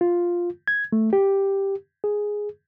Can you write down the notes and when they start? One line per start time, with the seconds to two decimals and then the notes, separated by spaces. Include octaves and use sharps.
0.01 F4
0.68 G#6
0.93 A3
1.13 G4
2.04 G#4